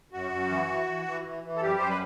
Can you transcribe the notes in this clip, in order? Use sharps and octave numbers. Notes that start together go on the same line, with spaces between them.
F#2 F#4
F#2
E3
E3
E3
E3
E3
E3
A4
F#2 G3 G4
F#2 C5
B4